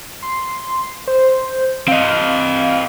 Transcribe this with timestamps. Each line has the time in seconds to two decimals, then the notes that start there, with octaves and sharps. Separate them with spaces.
0.22 C6
1.07 C5
1.88 C4 D#5 F5